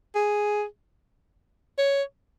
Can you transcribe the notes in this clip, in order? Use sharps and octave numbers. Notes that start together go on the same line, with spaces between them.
G#4
C#5